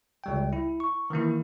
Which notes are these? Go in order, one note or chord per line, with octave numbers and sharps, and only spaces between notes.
C#2 G3 G5
E4
C#6
D#3 E3 A#3 E4